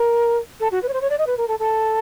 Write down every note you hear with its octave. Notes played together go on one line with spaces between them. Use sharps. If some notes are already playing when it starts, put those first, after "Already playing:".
Already playing: A#4
A4
F#4
B4
C#5
C5
C#5
D5
D#5
B4
A#4
A4
A4